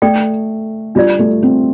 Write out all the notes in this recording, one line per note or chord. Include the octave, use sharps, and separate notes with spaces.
A3 A4 D5 G5
G3 D4 F4 D5
A3
C4